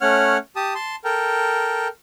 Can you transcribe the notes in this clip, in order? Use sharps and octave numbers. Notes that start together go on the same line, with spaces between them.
A3 C#4 C#5 F#5 F6
G4 A5 D#6
A5 C6
A4 A#4 G5